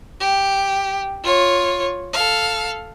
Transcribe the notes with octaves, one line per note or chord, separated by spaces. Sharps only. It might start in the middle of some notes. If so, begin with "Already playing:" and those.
G4
F4 C#5
A4 F5